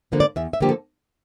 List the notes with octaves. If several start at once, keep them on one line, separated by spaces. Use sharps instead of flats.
D3 F3 A#3
D5
E2 E5
E5
D3 F3 A#3 G4
A4